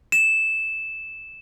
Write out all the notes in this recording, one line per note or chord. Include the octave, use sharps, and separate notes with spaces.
E7